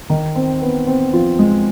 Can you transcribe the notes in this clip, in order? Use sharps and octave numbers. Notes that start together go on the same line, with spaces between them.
D#3 D#4
C4
B3
C4
F3 F4
G#3 G#4